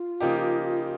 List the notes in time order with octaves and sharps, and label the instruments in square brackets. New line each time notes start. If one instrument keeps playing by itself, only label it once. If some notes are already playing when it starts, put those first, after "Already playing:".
Already playing: [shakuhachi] F4
[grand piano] C#3 F3 A#3 D#4 G4